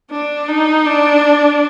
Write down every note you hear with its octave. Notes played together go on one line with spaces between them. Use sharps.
D4
D#4
D4